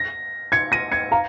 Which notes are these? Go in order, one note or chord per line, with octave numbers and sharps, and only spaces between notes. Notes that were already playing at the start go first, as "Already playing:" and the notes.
Already playing: A#6
G#6 C#7
A#6 D#7
G#6 C#7
F5 A#5